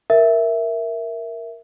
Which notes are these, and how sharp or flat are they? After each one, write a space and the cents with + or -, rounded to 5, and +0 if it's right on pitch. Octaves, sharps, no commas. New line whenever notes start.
A#4 +0 E5 +0